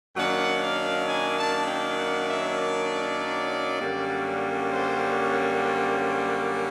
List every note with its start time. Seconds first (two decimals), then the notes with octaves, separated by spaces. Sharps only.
0.16 F#2 D#3 F#3 A#3 D4 F#5
0.61 F5
1.07 G#5
1.37 A5
1.66 G5
1.97 F#5
2.28 E5
2.58 D5
3.79 F#2 D3 G3 A#3 C#4
4.70 C5
5.15 C#5
5.60 C5